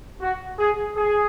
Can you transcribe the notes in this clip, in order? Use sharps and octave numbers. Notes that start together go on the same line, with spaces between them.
F#4
G#4
G#4